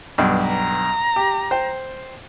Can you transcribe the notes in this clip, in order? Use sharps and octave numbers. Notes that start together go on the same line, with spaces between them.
B1 G2
A#5
G4
C5 G5